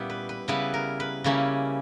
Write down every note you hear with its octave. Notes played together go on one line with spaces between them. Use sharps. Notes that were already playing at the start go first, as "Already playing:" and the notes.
Already playing: A#2 G3 B3 C#4 E4 G4
B4
B4
C#3 G3 B3 E4 B4
A#4
B4
C#3 G3 A#3 C#4 E4